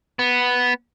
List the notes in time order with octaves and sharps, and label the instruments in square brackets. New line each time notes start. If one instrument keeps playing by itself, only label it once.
[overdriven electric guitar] B3